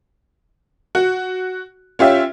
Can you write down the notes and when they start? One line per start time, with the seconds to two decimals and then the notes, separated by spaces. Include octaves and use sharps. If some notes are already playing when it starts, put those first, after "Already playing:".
0.95 F#4
1.99 C#4 F4 G4 E5